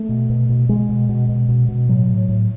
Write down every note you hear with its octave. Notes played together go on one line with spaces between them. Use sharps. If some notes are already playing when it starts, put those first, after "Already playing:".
Already playing: A3
B2
B2
B2
B2 G#3
B2
B2
B2
B2
B2
A2 F#3
A2
A2